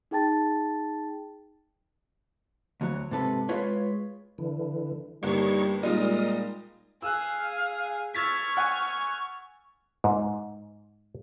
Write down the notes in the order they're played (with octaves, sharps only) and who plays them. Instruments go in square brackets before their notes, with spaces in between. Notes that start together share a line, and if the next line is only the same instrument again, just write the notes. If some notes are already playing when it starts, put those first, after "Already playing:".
[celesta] D#4 G#4 G5 A5 A6
[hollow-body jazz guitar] D2 F#3
G#2 C3 A4 B4
G#3 F4 B4 C#5
[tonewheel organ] D3 E3
[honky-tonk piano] G1 A#3 [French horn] G3 [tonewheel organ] D#4 C#5 C#6
[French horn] A#2 [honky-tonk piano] G3 G#3 D#4 [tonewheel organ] A#4 D#6
[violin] G#4 G#5 [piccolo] F5 [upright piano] E6 F#6
[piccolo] C#6 [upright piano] E6 A6 B6 [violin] F6 G#6
[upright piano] F#5 G#5
[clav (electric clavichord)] G#2